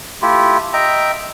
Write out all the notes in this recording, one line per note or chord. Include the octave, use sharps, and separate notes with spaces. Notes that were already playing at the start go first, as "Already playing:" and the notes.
A3 E4 F4 G4
D#5 E5 G5 A#5